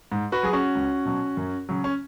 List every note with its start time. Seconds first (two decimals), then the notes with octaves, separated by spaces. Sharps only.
0.12 G#2
0.32 F#4 B4
0.43 F#3 G#4
0.53 C#4 F#4
0.75 C#2
1.05 B2 F#3
1.37 F#2
1.69 C#3 F#3
1.84 C#4